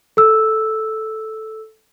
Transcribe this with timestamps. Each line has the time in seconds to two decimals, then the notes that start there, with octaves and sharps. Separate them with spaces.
0.17 A4 E6